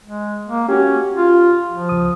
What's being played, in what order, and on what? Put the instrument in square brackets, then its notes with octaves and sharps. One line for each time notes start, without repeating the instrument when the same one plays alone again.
[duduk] G#3
A#3
[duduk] C#4 [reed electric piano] F#4 G4
[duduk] F4
F3
[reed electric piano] C#2 D#6